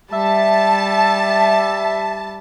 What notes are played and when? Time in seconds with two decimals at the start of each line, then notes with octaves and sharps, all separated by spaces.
0.12 G3 E5 A5